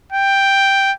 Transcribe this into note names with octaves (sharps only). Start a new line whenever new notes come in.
G5